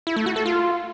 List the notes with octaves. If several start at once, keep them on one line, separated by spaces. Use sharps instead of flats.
E4
A3
F#4
A4
F4